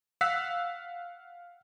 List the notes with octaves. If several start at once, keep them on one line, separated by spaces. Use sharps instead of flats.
F5 F#5 E6 F#6 B6